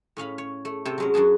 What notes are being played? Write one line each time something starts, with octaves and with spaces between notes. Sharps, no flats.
A2 C#4 F5 B5
C#5
A3
C3 A4 C5 G5
F#3 G#3 C#4
F#2 D4 F#4 G#4 A5